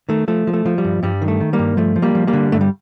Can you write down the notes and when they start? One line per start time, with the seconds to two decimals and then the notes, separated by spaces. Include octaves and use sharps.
0.09 D#3 A3
0.28 F3 A3
0.47 F3
0.53 A3
0.66 F3
0.78 G3
0.85 G2
1.03 G2 G3
1.22 D#3
1.28 A3
1.41 D#3
1.53 G3 A#3
1.59 G2
1.77 F3 A3
1.96 F3
2.02 G3 A#3
2.15 F3
2.27 G3 A#3
2.33 D3
2.52 G2 A3
2.61 G3